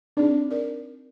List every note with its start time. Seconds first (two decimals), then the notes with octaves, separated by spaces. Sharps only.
0.17 C4 D4 D#4 G#4
0.51 A#4 D5